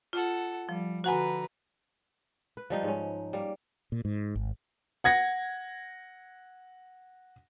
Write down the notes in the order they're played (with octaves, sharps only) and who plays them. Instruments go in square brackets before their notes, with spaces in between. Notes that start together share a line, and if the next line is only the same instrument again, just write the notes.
[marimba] F4 [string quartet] A4 F#5
[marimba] F3 [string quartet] G3
[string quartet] D3 B4 A#5 [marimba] F#4 F#5 G#5
[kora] B4
F3 G3 D#4
G#2 C#4
G3 A#3
[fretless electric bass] A#2
G#2
G#1
[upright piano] F#5 G#6 A#6